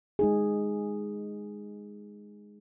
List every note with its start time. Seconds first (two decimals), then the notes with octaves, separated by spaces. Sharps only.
0.19 G#3 D#4 G#4